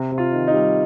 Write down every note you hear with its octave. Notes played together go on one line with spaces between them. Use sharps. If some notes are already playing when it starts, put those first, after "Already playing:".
Already playing: C3
C3
F4
D#3
D#4
G3